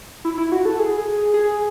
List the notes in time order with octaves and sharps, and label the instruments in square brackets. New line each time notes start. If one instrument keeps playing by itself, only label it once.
[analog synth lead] E4
E4
F#4
A4
G#4
G#4